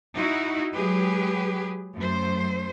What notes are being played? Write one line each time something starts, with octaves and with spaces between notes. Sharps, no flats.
D#4 E4 F#4
F#3 G#3 G4 G#4 B4
F#2 A3 C5